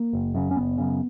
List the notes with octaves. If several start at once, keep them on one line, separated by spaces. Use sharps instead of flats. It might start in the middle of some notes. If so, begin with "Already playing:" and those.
Already playing: A#3
F#1
F#2 C#3
C#4
F#1 B3
F#2 C#3